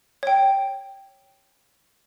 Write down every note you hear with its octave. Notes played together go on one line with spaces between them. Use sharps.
C#5 G5